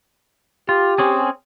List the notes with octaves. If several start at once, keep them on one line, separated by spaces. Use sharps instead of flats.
F4 G4
C4 C#4 G#4